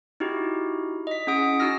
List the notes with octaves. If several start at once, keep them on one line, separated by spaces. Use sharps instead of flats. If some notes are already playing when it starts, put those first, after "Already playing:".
D#4 E4 F#4 G4
D#5 B6
C#4 E4 G#4 F#5 D#6 D7
D#4 F#4 G#5 E6 F6 A#6